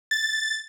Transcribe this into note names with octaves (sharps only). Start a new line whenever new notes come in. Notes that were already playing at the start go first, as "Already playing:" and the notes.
A6